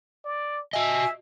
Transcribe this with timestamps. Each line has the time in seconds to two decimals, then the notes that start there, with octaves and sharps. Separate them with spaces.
0.25 D5
0.73 F#4 D#5 E5 G#5